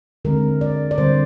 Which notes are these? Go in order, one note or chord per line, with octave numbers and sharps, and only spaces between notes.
D3 G#3 C4 A#4
D5
D5
D3 G3 C4 C5